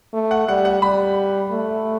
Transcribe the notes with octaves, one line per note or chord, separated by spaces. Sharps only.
A3
F#5
G3 F#5
F#5
G3 B5
A3